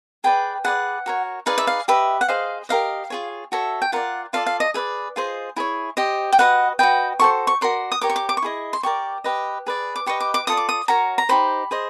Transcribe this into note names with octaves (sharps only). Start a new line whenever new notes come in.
G#4 B4 D5 G5
G#4 B4 D5 F#5
F#4 A#4 C#5
D#4 G#4 B4 D5 F5
E5
F5
G4 B4 D#5 E5
F#5
G#4 C5 D#5 F5
G4 A#4 D#5 F5
F4 G#4 C#5
F#4 A4 C#5 E5
G5
F4 A#4 D5 F#5
F4 A4 D5 F5
F5
D#5
G#4 B4 D5 E5
F4 G#4 C5 D#5
E4 G#4 C#5
G4 C5 D#5
G5
F#4 B4 D#5 F#5
F#4 B4 D#5 G5
F#4 A4 C5 C#6
C#6
F#4 A#4 D5 C6
D#6
G4 A#4 C#5 D6
C#6
D6
D6
C#6
E4 G#4 D#5
C6
G4 A#4 D5 C#6
G4 B4 D#5
G#4 B4 D5
D6
G4 B4 D#5 C#6
D6
D6
F4 A4 D5 D#6
D6
D#6
F#4 A#4 C#5 A#5
A#5
D#4 G4 C5 B5
G#4 C5 D#5